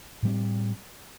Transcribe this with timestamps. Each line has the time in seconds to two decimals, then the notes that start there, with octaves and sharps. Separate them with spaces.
0.23 A2 G3 C4